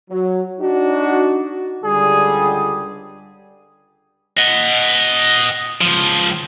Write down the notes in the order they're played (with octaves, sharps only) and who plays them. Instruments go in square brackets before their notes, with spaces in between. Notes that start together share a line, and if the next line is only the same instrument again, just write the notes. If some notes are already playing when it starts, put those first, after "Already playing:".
[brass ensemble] F#3
D4 D#4 F#4
[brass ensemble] C#2 D3 G3 [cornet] G#4
[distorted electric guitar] D#5 F#5
C#2 F3